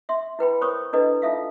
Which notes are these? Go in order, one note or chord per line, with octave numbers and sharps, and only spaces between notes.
E5 C6
E4 B4 G5 B5
A#4 C5 C#5 C#6 D#6
D4 E4 A4 B4 D#5
D#4 F4 A4 E5 F5